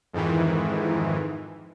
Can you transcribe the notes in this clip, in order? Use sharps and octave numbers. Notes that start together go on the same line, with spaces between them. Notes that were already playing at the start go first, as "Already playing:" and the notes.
F2 G#2 D#3 E3